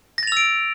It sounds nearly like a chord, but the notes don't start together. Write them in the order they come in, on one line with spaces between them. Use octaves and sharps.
A#6 A6 F7 E6 D7